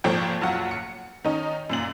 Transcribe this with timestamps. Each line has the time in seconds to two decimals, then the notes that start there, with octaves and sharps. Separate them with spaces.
0.04 G#1 A#2 F3 A4 C#5 G5
0.41 F#1 B1 F#3 F4 F#5
0.71 C#7
1.24 D#3 C#4 D#4
1.70 F#2 A#2 F#7